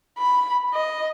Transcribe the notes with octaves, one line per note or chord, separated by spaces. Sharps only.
B5
D#5